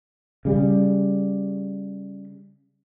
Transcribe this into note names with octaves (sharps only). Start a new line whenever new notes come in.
C#3 G3